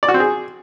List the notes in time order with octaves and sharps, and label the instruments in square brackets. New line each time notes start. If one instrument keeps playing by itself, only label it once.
[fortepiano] D5
F#4
C4
G#4